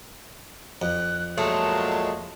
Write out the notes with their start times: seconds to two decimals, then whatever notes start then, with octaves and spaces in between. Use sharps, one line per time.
0.82 F2 F#6
1.38 A#2 F#3 G#3 A3 A5